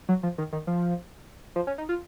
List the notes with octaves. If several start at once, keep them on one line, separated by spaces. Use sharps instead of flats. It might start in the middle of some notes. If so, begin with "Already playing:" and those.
F#3
F3
D#3
D#3
F3
F3
C#4
D#4
F4